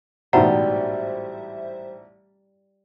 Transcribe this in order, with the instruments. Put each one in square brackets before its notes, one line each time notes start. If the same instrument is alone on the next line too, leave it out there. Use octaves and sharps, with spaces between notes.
[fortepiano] A1 G#2 B2 [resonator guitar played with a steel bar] G3 [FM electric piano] C5 E5 [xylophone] F#5 A#5